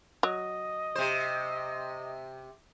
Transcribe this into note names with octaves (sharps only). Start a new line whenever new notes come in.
F#3 D#5
C3 C5